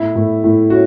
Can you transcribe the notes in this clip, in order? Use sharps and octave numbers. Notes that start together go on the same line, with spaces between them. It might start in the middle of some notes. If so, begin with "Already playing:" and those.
Already playing: A2 E4
A2
A2
C#4 F#4